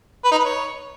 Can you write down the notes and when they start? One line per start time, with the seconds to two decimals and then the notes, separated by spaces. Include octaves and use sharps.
0.25 B4
0.32 D#4
0.38 B4
0.45 C#5